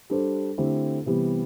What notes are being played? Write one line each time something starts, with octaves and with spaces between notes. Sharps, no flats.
G3 D4 A4 C5
D3 A3 C4 E4 G4
C3 E3 G3 B3